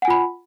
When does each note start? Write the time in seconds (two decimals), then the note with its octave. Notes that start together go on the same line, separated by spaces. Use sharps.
0.02 F#5
0.05 G#5
0.08 F4
0.10 B5